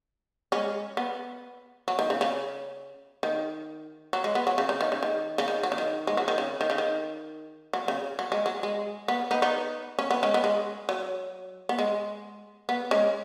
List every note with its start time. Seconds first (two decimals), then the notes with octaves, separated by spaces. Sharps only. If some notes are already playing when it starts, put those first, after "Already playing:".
0.52 G#3 C#4
0.97 B3
1.88 F#3
1.99 D#3
2.10 C#3
2.21 C#3
3.23 D#3
4.13 F#3
4.24 G#3
4.35 B3
4.47 F#3
4.58 C#3
4.69 C#3
4.81 D#3
4.92 C#3
5.03 D#3
5.38 C#3
5.48 D#3
5.63 F#3
5.72 C#3
5.78 D#3
6.07 G#3
6.17 F#3
6.28 D#3
6.38 C#3
6.61 D#3
6.70 C#3
6.78 D#3
7.73 F#3
7.88 C#3
8.19 F#3
8.32 G#3
8.46 F#3
8.63 G#3
9.08 B3
9.31 B3 D#4
9.42 B3 D#4
9.99 C#4
10.11 B3
10.23 G#3 C#4
10.34 B3
10.44 G#3
10.89 F#3
11.69 B3
11.79 G#3
12.69 B3
12.91 G#3 C#4